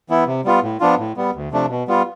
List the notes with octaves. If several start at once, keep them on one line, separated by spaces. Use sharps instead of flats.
E3 B3 E4
C3
G3 B3 F4
A2
F3 B3 D4 F4
A2
G3 B3
D2
C3 F3 A3 D4
B2
G3 B3 F4